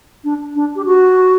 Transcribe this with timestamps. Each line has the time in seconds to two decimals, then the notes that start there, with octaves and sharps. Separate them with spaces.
0.24 D4
0.55 D4
0.76 G4
0.85 F#4